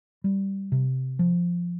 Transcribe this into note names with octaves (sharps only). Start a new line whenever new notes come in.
G3
C3
F3